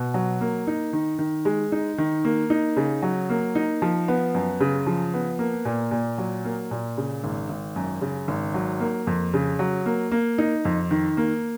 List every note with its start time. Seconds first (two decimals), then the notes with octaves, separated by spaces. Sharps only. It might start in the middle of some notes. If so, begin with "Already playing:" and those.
Already playing: B2
0.14 F#3
0.41 A#3
0.67 D#4
0.93 D#3
1.19 D#3
1.45 G#3
1.72 D#4
1.98 D#3
2.25 A#3
2.50 D#4
2.77 C#3
3.03 F#3
3.30 A#3
3.55 D#4
3.82 F3
4.08 B3
4.35 F#2
4.60 C#3
4.87 F3
5.14 B3
5.39 A#3
5.65 A#2
5.91 A#2
6.18 F#3
6.45 A#3
6.71 A#2
6.97 C#3
7.24 G#1
7.49 G#1
7.76 F#2
8.01 C#3
8.28 G#1
8.54 F#3
8.80 A#3
9.07 F2
9.34 C#3
9.59 F#3
9.86 A#3
10.11 A#3
10.38 D#4
10.65 F2
10.91 D#3
11.17 A#3